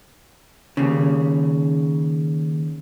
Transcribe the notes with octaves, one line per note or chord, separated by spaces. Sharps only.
D#2 C#3